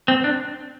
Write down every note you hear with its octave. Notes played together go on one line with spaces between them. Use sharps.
C4
D4